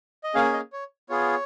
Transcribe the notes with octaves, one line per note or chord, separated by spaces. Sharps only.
D#5
A#3 C#4 G#4 F5
D#5
C#5
B3 F4 G#4 C#5